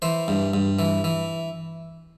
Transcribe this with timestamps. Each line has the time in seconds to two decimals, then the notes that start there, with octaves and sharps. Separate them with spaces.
0.02 E3 C5
0.28 G2
0.54 G2
0.79 E3
1.04 E3